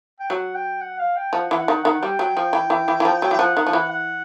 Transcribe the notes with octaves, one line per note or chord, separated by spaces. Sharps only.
G5
F#3 F#5
G5
F#5
F5
G5
F3 F#5
E3
F#5
D#3
D#3 F#5
G3 G5
F#3 G5
F3
E3
E3
E3
E3
F3
F#3
E3 G5
F3 F#5
D#3
F3
E3
F#5